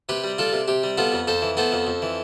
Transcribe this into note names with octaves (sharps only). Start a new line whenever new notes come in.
C3 G4 B4
G3
D4 F4 A4
C3
C3 G4
G3
B3 F4 A4
F2
F2 A4 C5
E3
B3 A4 C5
F2
F2
E3